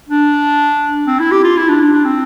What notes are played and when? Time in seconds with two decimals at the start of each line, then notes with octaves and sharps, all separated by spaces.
0.09 D4
1.07 C4
1.20 E4
1.32 G4
1.44 F4
1.57 E4
1.69 D4
1.81 D4
1.93 D4
2.05 C4